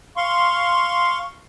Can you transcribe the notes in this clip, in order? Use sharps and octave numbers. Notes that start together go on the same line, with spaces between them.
F5 C6 C#6